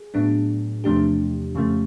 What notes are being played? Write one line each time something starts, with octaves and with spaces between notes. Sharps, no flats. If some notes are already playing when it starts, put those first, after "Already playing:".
Already playing: G#4
A2 F#3 B3 D4
E2 C3 F3 A3 D4 G4
F2 C#3 F3 A3